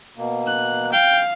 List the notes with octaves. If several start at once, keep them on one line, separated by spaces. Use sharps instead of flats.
B2 A#3
F#6
F5 G5